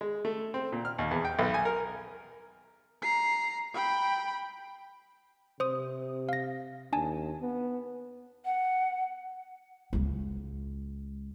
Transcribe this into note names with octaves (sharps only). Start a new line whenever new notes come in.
G#3
A3
C4
A#2
F6
D#2
E2
G5
B1
G#5
A#4
A#5 C7
G5 B5
C3 C5 D#6
F5 A#6
D#2 D4 G#5 A5
B3
F#5
C#2 G#3